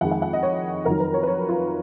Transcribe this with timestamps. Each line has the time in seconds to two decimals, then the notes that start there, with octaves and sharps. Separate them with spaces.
0.01 F2 D#3 G#3 F#5
0.11 F#5
0.22 F#5
0.33 D#5
0.43 C#5
0.85 F2 D#3 F#3 A#4
1.00 B4
1.14 C#5
1.23 B4
1.27 C#5
1.49 F4